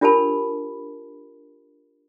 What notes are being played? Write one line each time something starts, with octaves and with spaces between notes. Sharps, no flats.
D4 F4 G4 A#4 A5 B5